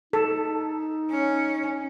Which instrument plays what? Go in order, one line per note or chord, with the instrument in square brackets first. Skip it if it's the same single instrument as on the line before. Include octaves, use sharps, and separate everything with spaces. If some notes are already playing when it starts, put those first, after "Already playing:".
[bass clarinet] D#4 [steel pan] A4
[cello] C#4